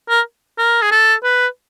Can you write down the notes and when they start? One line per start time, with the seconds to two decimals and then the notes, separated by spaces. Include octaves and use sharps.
0.09 A#4
0.58 A#4
0.82 G#4
0.91 A4
1.24 B4